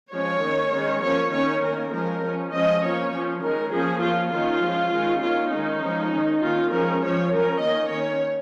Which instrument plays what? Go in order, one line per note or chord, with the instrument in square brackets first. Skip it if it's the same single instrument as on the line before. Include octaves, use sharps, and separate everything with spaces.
[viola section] F3 G#3 C#4 C#5
D#3 A#3 C#4
D#3 G#3 C#4
F3 A#3 C#4 C#5
D#3 A#3 C#4 C#5
D#3 A#3 C#4 A#4
F3 G#3 C#4 A#4
F3 C#4
F3 G#3 C#4 D#5
F3 A#3 C#4 C#5
F3 C#4
D#3 G#3 C#4 A#4
F3 A#3 C#4 G#4
F3 A#3 C#4 F4
D#3 A#3 C#4 F4
F3 G#3 C#4
D#3 G#3 C#4
D#3 A#3 C#4 F4
D#3 G#3 C#4 D#4
F3 G#3 C#4
D#3 C#4
D#3 A#3 C#4 F4
F3 G#3 C#4 A#4
F3 C#4 C#5
F3 C#4 A#4
D#3 A#3 C#4 D#5
D#3 A#3 C#4 C#5